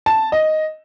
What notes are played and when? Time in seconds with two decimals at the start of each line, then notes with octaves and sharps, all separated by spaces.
0.06 A5
0.32 D#5